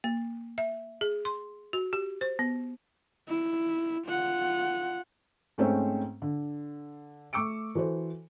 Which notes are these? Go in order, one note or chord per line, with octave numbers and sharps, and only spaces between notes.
A#3
E5
G#4
C6
F#4
G4
C5
B3
E4
F4 F#5
G#2 A3 C4 C#4 C5 G5
D3
A3 C#6 D6 E6 C#7 D7
E3 F#4 A4 C5